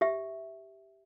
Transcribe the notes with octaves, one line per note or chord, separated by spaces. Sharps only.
G4 E5